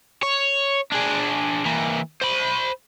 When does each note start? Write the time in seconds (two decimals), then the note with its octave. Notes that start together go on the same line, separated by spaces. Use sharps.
0.23 C#5
0.92 D4 G#4
1.66 E3 A#3
2.21 C5 B5